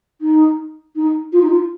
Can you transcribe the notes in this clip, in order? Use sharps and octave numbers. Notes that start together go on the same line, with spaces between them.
D#4
D#4
F4
D#4
F4